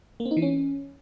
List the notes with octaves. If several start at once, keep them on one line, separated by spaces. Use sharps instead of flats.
A#3
C4
D#4
E3
C#4